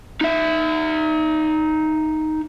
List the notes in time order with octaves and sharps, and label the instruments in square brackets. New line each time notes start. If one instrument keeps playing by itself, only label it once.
[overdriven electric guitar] D#4 E5